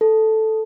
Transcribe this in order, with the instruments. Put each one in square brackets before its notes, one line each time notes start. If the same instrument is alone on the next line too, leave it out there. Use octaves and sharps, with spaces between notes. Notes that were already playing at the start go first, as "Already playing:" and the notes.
[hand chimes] A4